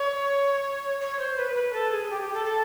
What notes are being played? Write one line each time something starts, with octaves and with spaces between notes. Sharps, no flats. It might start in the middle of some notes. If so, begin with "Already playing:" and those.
Already playing: C#5
C#5
C5
B4
B4
A4
G#4
G4
G4
A4
A4